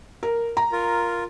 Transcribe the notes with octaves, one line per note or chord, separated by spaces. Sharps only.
A#4
A#5
F4 A#4